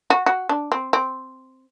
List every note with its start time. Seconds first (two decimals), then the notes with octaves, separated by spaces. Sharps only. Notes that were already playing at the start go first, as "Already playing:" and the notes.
0.10 F#4
0.26 F#4
0.49 D4
0.72 C4
0.93 C4